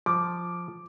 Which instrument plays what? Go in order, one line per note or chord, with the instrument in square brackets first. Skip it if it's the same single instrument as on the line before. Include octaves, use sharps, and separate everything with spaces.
[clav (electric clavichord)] F3 [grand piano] D6